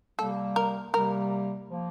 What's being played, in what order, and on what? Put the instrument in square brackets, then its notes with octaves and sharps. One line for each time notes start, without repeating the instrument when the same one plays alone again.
[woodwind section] C3 G3 A#3 [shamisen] A4
[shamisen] A#4
[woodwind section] C3 G3 A#3 [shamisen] A#4
[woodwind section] F3 A#3